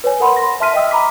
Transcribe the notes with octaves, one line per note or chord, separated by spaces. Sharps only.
B4 C#5 G#5
A#4 F#5 B5 C6
C6 A#6
E5 A5 C6 F6 B6 D#7
D#5 E5 G5 D#6 E6
A#5 B5 D6 B6